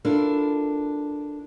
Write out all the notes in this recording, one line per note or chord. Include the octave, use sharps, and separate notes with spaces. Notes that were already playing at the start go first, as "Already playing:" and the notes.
D4 E4 F4 A4 A#4